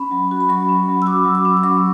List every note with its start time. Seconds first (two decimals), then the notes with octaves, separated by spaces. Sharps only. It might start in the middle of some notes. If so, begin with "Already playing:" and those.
Already playing: C#4 B5
0.11 F#3
0.31 F#4
0.40 B5
0.49 F#3 C#6
0.69 C#4
0.88 F#3
1.02 E6
1.06 F#4 D6
1.25 F#3
1.35 D6
1.45 C#4
1.57 D6
1.64 F#3 C#6